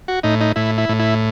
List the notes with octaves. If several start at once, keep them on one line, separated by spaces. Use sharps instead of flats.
F#4
A2 D#4
D#4
A2 E4
E4
A2
E4